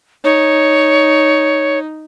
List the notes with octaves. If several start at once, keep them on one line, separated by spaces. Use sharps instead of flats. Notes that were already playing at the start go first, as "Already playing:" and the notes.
D#4 C#5